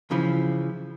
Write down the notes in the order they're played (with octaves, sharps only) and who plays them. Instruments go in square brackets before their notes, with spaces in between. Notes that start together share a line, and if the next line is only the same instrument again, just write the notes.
[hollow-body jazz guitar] C#3 E3 F3